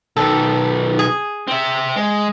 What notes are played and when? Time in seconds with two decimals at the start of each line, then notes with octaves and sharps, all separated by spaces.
0.17 B1 D#3 A4
0.99 G#4
1.47 C4 E5
1.96 G#3